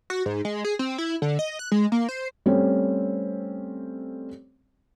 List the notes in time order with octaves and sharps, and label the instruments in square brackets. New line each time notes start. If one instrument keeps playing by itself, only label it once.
[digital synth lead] F#4
G#2
G#3
G#4
C4
E4
D3
D#5
F#6
G#3
A#3
C5
[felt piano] G3 A3 C4 C#4